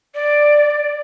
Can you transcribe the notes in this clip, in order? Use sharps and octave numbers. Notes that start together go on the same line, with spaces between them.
D5